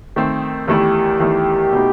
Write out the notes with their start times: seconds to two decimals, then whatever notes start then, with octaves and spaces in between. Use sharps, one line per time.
0.16 D#3 A3 C4
0.68 E2 D#3 A3 E4 G4
1.20 E2 D#3 A3 E4
1.73 B2 A3 D#4